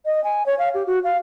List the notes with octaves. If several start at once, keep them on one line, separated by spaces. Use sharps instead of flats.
D#5
G#5
C#5
F5
G4
F#4
F5